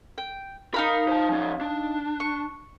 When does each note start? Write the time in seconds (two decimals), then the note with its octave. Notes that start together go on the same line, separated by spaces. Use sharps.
0.18 G5
0.74 D#4 A#4 F5 A#5 B5
1.08 C5 A5
1.29 F3 C#4
1.61 D4
2.20 C#6